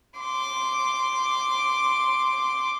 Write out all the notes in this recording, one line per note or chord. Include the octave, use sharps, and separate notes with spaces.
C6 D6